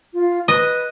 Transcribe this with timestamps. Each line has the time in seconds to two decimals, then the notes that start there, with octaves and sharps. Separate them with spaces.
0.14 F4
0.48 B4 D#5